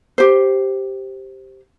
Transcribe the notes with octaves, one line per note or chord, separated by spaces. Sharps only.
G4 C5